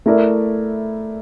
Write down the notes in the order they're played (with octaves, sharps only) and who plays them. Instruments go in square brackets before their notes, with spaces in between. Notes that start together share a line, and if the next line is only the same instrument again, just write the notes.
[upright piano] A3 E4 A#4 D5